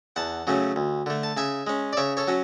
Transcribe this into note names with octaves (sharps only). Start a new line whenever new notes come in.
E2 F#5 A5
C#3 F#3 A3 C#4
D2
D3 A3
A5
C#3 E5 G#5
G#3 C#4
D5
C#3 C#5 E5
A4 C#5
F#3 C#4